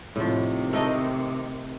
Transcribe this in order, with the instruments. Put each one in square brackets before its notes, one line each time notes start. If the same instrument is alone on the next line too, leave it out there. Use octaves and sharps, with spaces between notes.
[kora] A2 F3 [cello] C3 D#3
[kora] A3 D#4 D#5